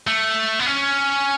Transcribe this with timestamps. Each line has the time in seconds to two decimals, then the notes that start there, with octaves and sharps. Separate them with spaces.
0.07 A3
0.60 B3
0.66 C#4